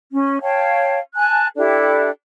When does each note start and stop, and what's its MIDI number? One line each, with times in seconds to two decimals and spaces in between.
0.12 0.40 61
0.41 0.99 73
0.41 0.99 77
0.41 0.99 79
0.41 0.99 81
1.15 1.47 80
1.15 1.47 81
1.15 1.47 90
1.56 2.09 62
1.56 2.09 64
1.56 2.09 67
1.56 2.09 69